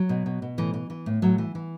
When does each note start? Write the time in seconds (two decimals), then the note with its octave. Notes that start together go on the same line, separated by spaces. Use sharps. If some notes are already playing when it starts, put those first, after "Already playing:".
Already playing: F#3
0.09 B2
0.26 B2
0.42 B2
0.58 A2 E3
0.74 E3
0.90 E3
1.06 A2
1.22 A2 F#3
1.38 E3
1.55 E3